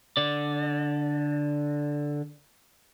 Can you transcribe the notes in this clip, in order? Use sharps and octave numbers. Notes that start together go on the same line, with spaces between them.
D3 D5